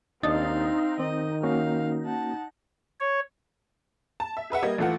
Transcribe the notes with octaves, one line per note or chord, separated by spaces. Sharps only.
D#2 C4 D4 D#4 F5 A6
D#3 C4 D#5
A#3 C#4 F#4 F5
F#5 A5
C#5
A5
E5
G#4 B4 E5 F#5
G3 A#3 D#5 G#6
A1 E3 A3 F4 F#5